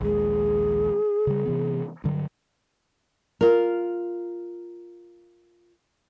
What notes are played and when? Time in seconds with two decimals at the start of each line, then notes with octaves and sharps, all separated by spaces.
0.01 A#1 D#2 G#3 G#4
1.27 C#3 G3
1.46 C3 E3 B3
2.04 G2 D3 F#3
3.41 F4 A#4